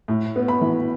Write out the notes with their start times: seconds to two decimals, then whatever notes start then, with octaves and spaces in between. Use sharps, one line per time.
0.08 A2
0.36 B3
0.48 B5
0.61 E3